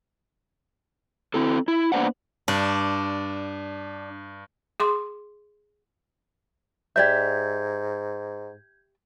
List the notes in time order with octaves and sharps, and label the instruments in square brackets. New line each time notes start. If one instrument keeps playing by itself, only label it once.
[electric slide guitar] C4 E4 A4
E4
A#3 B3 D4 C5 D5 F#5
[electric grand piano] G2 [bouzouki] D4
[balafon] G#4 C6 D6
[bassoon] G#2 [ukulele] G4 D5 E5 [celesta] G6 G#6